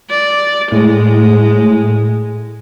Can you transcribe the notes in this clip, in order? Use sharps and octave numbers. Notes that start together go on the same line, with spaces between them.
D5
A2 G#3